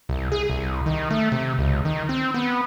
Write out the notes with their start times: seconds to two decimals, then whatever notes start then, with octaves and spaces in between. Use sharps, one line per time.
0.09 C2
0.32 G#4
0.50 C2
0.86 D#3
1.11 A3
1.32 C3
1.58 C#2
1.85 D#3
2.09 C4
2.34 B3